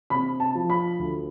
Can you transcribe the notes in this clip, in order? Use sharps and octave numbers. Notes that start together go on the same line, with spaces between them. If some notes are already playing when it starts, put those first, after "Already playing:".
C3 B5
A5
F3
B5
D2